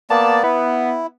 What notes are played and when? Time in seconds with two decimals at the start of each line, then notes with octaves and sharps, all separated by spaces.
0.10 A#3 B3 D5 A5
0.43 B3 E4